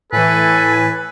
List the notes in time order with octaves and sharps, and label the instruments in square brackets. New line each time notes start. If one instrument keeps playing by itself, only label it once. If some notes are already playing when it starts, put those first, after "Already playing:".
[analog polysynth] A2 E3 [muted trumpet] A4 [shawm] B4 [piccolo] G#5